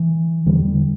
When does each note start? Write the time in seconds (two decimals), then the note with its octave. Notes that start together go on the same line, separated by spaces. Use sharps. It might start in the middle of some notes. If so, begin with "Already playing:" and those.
Already playing: E3
0.46 E2 D3 G3